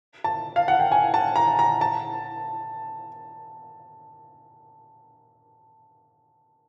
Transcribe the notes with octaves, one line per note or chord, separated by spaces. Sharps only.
A5
F5
F#5
G5
G#5
A5
A#5
A#5
A5